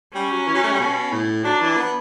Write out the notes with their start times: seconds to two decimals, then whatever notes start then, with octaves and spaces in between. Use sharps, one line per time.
0.15 G3 C#4
0.32 F#3
0.47 E3
0.55 F#3
0.64 A3
0.72 G3
0.80 B2
1.12 A2
1.45 F#3 D4
1.61 E3
1.77 B3